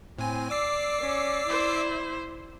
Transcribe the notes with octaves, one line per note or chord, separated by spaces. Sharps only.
A2 C4 G#5
D5 D6 E6 C7
C#4 D5
E4 C5